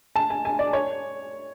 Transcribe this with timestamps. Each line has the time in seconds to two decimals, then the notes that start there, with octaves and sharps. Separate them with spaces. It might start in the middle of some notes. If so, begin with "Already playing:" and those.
0.16 A5
0.30 G#5
0.45 G#5
0.59 D5
0.73 C#5